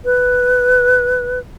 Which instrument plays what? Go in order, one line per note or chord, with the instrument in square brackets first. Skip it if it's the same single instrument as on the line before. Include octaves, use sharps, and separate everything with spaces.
[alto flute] B4